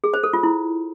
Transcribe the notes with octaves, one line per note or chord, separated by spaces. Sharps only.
G#4
C5
A4
F4
E4